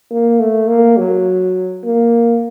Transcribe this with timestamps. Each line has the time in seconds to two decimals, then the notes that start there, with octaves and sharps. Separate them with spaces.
0.11 A#3
0.40 A3
0.69 A#3
0.97 F#3
1.84 A#3